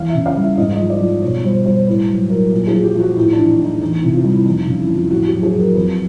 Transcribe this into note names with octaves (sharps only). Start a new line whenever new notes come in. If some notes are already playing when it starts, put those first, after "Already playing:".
Already playing: E2 F5
E5
C#3
F5
G3
E5
G#2 D#5
D#5
F3
D5
F3
B2 C#5
G3 C5
G3 C5
A2 B4
F#3
F#3 A#4
A#2
G#4
F3 F#4
G4
F3 F#4
A2 D#4
D4
E3
D#4
A2
D#4
E2 D#4
E4
C3
F4
G3
E4
F2 D#4
C#3
E4
F2 F4
A2 F#4
G4
F#3
G#4
F#3
A#4
F2 B4